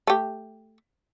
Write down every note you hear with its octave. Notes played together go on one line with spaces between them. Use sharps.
A3 G4